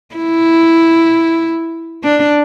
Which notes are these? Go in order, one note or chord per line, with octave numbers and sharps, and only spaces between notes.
E4
D4